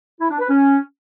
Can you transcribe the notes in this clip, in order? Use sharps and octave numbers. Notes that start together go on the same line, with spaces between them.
E4
D4
B4
C#4